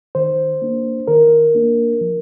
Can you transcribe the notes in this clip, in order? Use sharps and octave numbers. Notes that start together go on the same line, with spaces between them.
D#3 C5
A#3 D4
D#3 A#4
A#3 D4
F3